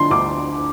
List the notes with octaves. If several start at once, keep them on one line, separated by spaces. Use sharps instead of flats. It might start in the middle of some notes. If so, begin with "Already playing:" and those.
Already playing: D3 F3 C6
D2 D6